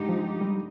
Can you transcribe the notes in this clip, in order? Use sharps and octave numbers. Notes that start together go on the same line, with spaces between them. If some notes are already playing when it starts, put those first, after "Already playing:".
Already playing: G2 D3 G#3 D#4 G4
F3
G3